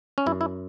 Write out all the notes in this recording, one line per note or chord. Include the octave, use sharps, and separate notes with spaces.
C#4
F#2 E4
E4